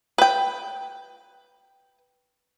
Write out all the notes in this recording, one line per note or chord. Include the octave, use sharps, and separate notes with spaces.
B4 G5